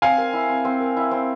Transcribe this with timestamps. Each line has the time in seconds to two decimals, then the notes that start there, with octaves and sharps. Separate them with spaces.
0.02 C4 F5 G#5
0.18 A#4
0.33 E4
0.49 C4
0.65 C4
0.80 A#4
0.97 E4
1.11 C4